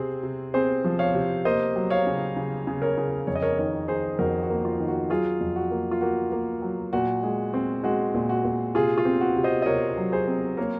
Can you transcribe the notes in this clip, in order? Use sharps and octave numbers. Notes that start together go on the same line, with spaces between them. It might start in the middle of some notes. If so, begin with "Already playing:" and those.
Already playing: C3 C4 G#4 C5
C3
C4 G#4 C5
F3
C#5 F5
C3
A#3 C5 D#5
F#3
C#5 F5
C#3
C#3
C#3
A#4 C#5
C#3
F2 C#5
D#5
A#4 C#5
D#3 A#4 C#5
D#3 G#4 C5
F2 F#4 A#4
F#4
A#3
F4
D#3
F#4
F#3 F4 G#4
F2
F#4
A#3
F4
A#3 F#4
A#3
F#3
A#2 F#4
G#3
C4
G#3 F#4
A#2
F#4
A#2
C3 F4 G#4
F4
C4
F#4
C3
C5 D#5
D#5
C3 A#4 C#5
F#3
G#4 C5
C4
A#3 A#4 C#5